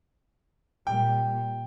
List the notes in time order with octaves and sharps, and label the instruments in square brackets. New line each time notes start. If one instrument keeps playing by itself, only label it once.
[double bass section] A#2 G3 [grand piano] G5